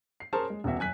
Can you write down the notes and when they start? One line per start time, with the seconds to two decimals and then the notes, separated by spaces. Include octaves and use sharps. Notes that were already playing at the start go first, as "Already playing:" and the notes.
0.20 C7
0.33 C#4 G#4 A#4 C5 C#5 A5
0.50 G#3
0.64 D#1 E2 B2 F#4 E5
0.79 F#2 G#5 F#6 B6